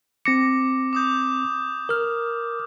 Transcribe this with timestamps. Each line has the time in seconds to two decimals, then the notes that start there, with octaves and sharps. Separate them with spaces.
0.25 C4 D6 A#6 C#7
0.93 D6 D#6 G6
1.89 A#4 F6